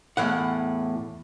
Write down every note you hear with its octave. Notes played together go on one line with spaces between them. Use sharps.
E2 A2 F#5